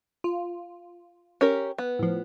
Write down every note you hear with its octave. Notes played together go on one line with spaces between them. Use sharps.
F4
C#4 G4 A#4
B3
A2 F3